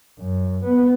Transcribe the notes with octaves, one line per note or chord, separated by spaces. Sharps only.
F#2
B3